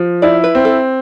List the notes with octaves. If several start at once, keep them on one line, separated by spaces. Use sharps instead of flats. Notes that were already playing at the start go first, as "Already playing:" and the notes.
Already playing: F3
E4 D5
B4
C4
A4